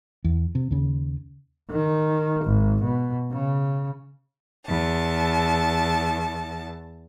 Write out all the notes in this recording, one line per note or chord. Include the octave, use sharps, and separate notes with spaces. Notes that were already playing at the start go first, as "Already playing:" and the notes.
E2
C3
D#2 C#3
D#3
G#1
B2
C#3
E2 A5